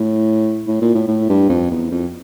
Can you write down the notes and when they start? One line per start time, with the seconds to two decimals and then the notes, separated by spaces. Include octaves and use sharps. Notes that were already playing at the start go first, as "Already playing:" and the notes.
Already playing: A2
0.67 A2
0.81 A#2
0.95 A2
1.08 A2
1.29 G2
1.49 F2
1.71 E2
1.91 F2